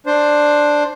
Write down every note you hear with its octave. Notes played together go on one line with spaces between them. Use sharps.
D4 C5